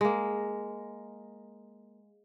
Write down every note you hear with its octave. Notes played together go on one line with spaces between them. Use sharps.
G#3 A#3